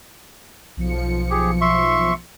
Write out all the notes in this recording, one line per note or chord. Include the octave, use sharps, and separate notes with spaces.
B1 F3 C#7
G4 G#4
E5 C6 C#6